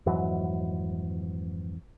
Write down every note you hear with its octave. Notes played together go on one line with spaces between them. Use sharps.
F2 G#2 E3 F#3